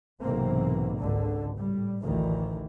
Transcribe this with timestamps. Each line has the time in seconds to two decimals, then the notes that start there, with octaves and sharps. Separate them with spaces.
0.21 B1 G#2 C3 E3 A#3 C4
0.98 G#1 C#2 D3
1.56 A2 G3
2.02 A1 D2 A2 D#3 E3